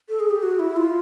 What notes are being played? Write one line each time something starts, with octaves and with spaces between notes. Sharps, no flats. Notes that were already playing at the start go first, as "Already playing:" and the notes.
A4
G#4
G4
F#4
E4
F4